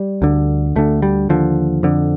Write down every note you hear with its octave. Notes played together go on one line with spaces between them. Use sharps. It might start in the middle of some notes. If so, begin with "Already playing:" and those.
Already playing: G3
D2 D3
D2 D3 A3
G3
D#2 D3 F3
F2 D3